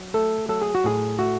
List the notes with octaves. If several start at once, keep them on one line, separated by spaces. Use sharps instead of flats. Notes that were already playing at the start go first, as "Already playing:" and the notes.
Already playing: F#3
A3 A4
F#3 A4
G#4
F#4
A2 G#4
A3 F#4